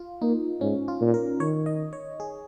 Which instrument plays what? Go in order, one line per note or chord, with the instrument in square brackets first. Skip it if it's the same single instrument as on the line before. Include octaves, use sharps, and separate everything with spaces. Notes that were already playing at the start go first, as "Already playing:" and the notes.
Already playing: [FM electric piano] F4
[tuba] A#3 [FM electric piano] D#4
[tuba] G#2 [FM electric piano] C#4
[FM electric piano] F4
[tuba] A#2
[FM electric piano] A#4
[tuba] D#3 [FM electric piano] C#5
[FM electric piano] D#5
C#5
G#4